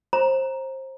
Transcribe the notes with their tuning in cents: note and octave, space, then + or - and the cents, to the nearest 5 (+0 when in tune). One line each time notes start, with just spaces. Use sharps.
C5 +25 A#5 +10